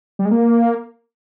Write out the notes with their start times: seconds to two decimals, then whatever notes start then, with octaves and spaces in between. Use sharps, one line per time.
0.19 G3
0.25 G#3
0.31 A#3